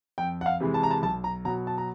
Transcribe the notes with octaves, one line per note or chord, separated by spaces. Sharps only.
F2 G5
F#5
F5
C3 E3 G#3
A5
A#5
A5
B1 A5
A#5
B2 F#3 A#5
A5
A#5